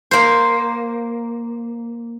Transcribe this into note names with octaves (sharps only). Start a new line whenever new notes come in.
A#3 C5